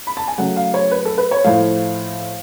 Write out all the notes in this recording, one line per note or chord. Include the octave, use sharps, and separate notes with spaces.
B5
A5
G#5
C#3 F#3 A3 F#5
F5
C#5
B4
A4
B4
C#5
A2 F3 A3 F5